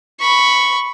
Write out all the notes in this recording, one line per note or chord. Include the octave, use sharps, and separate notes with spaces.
B5 C#6